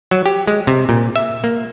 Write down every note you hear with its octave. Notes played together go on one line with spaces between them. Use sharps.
F#3
G4
G#3
C3
A#2
E5
A#3